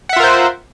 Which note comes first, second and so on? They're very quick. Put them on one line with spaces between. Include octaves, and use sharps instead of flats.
F#5 E5 F4 A#4 C5